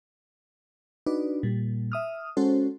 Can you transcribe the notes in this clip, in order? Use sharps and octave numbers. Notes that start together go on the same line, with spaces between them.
D4 D#4 F#4 B4 D5
A#2 G3
E5 D#6 F6
G#3 C#4 F#4 A4 C5